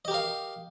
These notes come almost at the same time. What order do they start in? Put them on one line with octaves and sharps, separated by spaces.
D#5 G4 A#4 F5